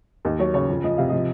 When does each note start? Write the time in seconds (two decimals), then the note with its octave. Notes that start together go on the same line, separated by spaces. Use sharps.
0.25 D#2 D#5
0.39 F#3 C#5
0.54 C#3 C#5
0.69 F2
0.84 F3 D#5
0.97 C3 F5
1.09 F3 D#5